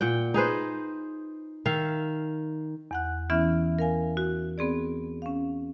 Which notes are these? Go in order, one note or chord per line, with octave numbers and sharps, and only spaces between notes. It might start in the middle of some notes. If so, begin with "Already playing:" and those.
A#2 F#5 G5
D#4 G#4 B4 C5
D#3 E5 F5
E2 F#5 F#6
E3 B3 C#4 E4 E5 F6
A#4 F5 G#5
F#4
B3 C4 G#4 D5
C#4 F5